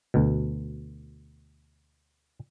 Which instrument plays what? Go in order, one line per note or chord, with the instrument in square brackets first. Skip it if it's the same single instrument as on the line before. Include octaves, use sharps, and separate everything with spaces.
[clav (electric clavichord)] D2 B2